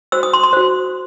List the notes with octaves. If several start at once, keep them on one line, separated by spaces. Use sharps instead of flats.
F#4 C5 E6
D#6
C6
C6
F#4 C5